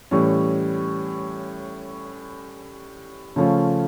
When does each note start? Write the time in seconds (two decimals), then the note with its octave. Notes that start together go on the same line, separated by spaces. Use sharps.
0.11 A2 E3 G3 C#4
3.36 C#3 F3 A3 C#4 F4